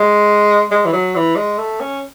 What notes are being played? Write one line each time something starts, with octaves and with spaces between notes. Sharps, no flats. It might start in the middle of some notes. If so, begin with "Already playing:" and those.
Already playing: G#3
G#3
E3
F#3
E3
G#3
A3
C#4